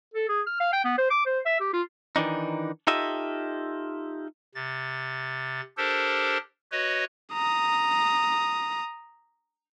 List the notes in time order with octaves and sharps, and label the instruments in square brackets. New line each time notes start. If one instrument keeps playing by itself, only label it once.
[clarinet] A4
G#4
F6
F5
G5
B3
C5
D6
C5
E5
G4
F4
[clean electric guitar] D#3 E3 D4 D#4
D#4 F4 G4 A4 D#5 E5
[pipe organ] C3 A6
D4 G4 A4 A#4 C5
F#4 B4 C#5 D#5
[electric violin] A#5 D#6